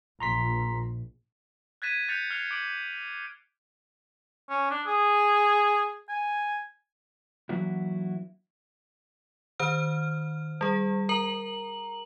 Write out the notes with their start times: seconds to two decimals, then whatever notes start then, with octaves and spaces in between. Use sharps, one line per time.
0.20 A#1 A#5 C6 B6
1.82 F#6 G#6 A6 B6 D#7 E7
2.08 F#6 G6 A6 B6 C#7 F7
2.31 F6 F#6 C7 C#7 F7
2.51 D6 A6 D7 F#7
4.50 C#4
4.71 D4
4.87 G#4
6.09 G#5
7.49 E3 F#3 A#3 D4 E4 F#4
9.59 D#3 C5 F6
10.61 G3 G#4
11.09 A#4 A#5 F#7